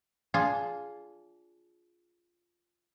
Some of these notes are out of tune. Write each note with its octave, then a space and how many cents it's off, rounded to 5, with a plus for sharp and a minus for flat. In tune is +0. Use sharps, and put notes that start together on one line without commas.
D4 -25 F4 +0 G#4 +0